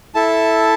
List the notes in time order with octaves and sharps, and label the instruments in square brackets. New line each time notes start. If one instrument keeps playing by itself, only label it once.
[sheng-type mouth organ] E4 A4 E5 A5